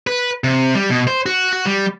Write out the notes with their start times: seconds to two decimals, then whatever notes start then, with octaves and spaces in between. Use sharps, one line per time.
0.07 B4
0.44 C3
0.75 G3
0.90 B2
1.07 C5
1.26 F#4
1.53 F#4
1.66 G3